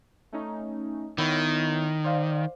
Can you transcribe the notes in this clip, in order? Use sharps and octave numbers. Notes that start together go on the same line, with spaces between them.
A3 C#4 D#4
D#3 B3 E4 C#5
C5 D5 F5